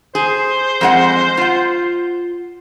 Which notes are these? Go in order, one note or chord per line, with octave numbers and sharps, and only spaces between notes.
G#4 C5
F2 G#3 F#5
F4 F#5